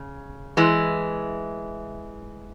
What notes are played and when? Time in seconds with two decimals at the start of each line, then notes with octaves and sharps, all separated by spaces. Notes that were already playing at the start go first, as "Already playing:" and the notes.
Already playing: C#3
0.57 E3 G#3